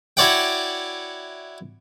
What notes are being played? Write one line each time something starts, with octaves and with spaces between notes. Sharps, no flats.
E4 F#4 C#5 D5 F#5 G5